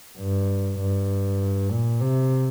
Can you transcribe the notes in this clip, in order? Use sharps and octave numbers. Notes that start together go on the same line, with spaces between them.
G2
G2
A#2
C3